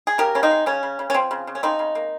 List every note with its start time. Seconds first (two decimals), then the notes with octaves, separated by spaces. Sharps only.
0.07 G#4
0.18 C#3 G4 A#4
0.35 C#3 C#4
0.43 C4 D#4
0.51 G#3
0.66 C#3 C#4
0.83 C#3
0.99 C#3
1.10 C#4
1.14 F3 C4
1.31 C#3
1.47 C#3
1.55 C#4
1.63 C#3 C4 D#4
1.79 C#3
1.95 A#3